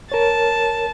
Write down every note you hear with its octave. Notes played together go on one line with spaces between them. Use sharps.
A#4 C#5 A5